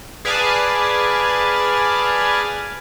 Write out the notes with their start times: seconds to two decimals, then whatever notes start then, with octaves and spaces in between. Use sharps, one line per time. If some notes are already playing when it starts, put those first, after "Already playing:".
0.25 G#4 B4 D5 F5 G#5 A5